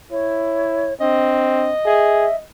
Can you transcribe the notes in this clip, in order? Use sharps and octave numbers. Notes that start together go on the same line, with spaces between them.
E4 C#5
C4 D4 D#5
G#4 E5